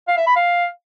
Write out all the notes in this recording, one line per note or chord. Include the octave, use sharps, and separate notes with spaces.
F5
E5
B5
F5